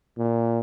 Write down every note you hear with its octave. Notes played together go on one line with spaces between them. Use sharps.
A#2